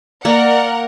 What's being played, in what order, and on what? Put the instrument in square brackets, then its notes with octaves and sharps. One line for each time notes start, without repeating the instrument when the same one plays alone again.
[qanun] A#3 [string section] A#4 F#5 [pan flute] D5